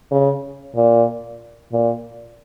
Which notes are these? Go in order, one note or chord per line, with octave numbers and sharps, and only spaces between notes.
C#3
A#2
A#2